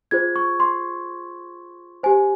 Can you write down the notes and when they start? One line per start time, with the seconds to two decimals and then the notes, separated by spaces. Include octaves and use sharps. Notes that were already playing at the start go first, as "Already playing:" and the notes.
0.11 F4 G#4 C5 G#6
0.36 C#6
0.60 C6
2.03 G4 C5 G#5